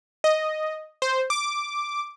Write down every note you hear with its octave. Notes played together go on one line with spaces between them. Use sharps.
D#5
C5
D6